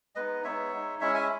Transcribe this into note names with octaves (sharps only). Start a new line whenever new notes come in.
G#3 B3 D#4 B4 D#5
G#3 B3 D#4 C#5 E5
G#3 D#4
G#3 C#4 E4 C#5 E5
E5 G#5